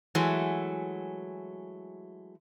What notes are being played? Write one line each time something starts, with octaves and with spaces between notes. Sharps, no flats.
E3 F#3 G#3 A3